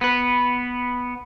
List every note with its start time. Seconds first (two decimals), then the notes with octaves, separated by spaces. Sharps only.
0.01 B3 B4